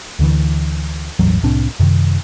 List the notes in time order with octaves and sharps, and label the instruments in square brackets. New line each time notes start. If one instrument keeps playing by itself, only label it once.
[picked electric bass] D2 D3 E3
A1 E2 G2 F#3
C2 A2 C4 D4
F#2 C3 D#3